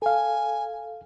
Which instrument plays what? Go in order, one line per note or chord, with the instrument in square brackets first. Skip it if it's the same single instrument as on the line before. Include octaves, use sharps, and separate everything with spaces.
[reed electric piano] A4 F5 [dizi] G#5